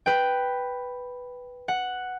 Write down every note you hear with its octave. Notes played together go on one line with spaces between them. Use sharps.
B4 G5
F#5